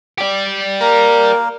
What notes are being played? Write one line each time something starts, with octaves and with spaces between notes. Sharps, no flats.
G4 D5
A#3 A#4